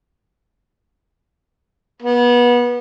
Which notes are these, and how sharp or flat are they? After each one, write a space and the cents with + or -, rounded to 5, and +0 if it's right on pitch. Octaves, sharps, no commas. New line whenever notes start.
B3 -25